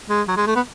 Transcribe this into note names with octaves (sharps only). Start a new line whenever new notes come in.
G#3
F#3
G#3
A3
B3